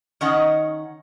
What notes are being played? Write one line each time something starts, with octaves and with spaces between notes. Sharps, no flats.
D#3 C#4 D#4 F#5